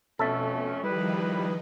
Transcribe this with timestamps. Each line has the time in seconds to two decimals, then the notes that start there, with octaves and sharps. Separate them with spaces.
0.19 F2 B2 A3 C#4 A4 E5
0.83 D#3 F3 G3 D#4 E4 G#4 B4